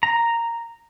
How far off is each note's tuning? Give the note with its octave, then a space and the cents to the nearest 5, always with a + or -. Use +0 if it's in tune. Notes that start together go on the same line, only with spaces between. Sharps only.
A#5 -5